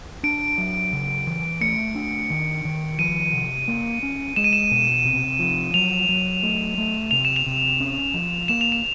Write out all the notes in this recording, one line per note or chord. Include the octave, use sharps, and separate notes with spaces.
D4 D7
F#3
C#3
E3
A3 C#7
D4
D#3
D#3
F3 D#7
C3
A#3
C#4
G#3 E7
D#7
E7
B2
C3
F3
F#3 F7
F#3
A3
A3
C3 F7
E7
F7
C3
C#4
F3
A#3 E7
F7
E7